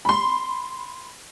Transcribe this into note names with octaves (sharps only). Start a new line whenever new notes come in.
B5 C6